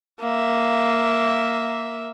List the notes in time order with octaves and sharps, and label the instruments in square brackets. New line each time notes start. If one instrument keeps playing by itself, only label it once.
[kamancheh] A#3 E5